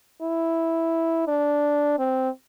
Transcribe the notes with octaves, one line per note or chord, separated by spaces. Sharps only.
E4
D4
C4